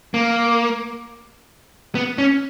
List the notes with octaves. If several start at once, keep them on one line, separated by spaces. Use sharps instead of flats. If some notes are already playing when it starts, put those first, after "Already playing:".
A#3
B3
C#4